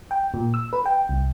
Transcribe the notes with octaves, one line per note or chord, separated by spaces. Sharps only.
G5
A#2
E6
B4
G5
C2